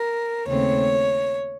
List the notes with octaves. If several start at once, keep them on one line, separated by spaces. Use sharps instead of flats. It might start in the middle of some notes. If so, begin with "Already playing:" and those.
Already playing: A#4
D#2 C#3 A3 C4 C#5